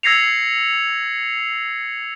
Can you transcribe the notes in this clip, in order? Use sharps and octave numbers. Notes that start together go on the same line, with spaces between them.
E6 G#6 A#6 C7 C#7 F7